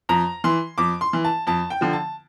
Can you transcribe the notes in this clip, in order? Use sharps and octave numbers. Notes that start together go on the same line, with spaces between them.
F2 A#5
E3 C6
F2 D6
C6
E3
A5
F2 A5
G5
D3 F3
A5